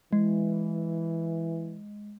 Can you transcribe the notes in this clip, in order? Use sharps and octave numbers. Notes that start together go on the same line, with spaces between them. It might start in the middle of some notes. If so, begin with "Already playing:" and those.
E3 G#3